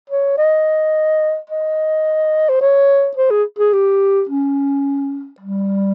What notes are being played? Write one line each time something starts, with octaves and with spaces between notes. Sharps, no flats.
C#5
D#5
D#5
C5
C#5
C5
G#4
G#4
G4
C#4
G3